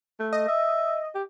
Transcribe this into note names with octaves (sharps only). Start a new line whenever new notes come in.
A3
D#5
E5
G4